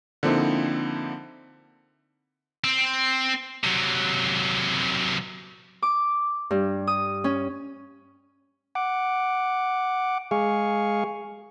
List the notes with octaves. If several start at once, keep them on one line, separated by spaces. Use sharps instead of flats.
D3 F3 A#3 C4 D#4 E4
C4
C3 F#3
D6
G2
D#6
C#4
F#5 D6
G#3 G#4 F5 C#6